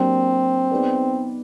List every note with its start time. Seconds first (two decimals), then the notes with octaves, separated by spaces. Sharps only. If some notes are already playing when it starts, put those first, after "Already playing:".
Already playing: F#3 A#3 C4 D4 G4
0.71 B3 D#4 G#4 B4 D5